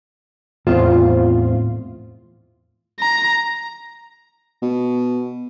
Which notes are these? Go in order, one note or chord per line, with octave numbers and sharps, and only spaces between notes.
E2 A2 C4 F4 C5
A#5
B2